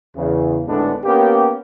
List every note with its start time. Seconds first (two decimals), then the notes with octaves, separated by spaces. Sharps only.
0.16 E2 C#3
0.67 G#1 A2 D3 G#3 B3 D4
1.04 A#3 B3 C#4 G4